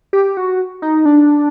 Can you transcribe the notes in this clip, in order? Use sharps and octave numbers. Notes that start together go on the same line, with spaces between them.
G4
F#4
D#4
D4